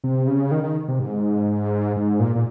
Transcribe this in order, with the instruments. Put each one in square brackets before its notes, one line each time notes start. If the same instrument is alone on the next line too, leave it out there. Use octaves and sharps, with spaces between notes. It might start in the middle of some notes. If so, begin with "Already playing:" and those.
[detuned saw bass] C3
C#3
D#3
D#3
C3
G#2
G#2
A#2
A#2